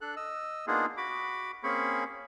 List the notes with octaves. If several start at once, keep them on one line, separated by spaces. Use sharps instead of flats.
D4 A4 F#6
D#5 E6
A#3 B3 D4 D#4 F4 G#4
F#4 B5 D6
A#3 C4 C#4 G#4 B5 C#6